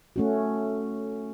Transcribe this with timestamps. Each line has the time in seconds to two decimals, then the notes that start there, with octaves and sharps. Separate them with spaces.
0.16 A3 C#4 F#4